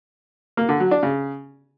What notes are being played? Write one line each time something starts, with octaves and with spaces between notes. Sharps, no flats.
A#3
D3
F#3
D4
C#3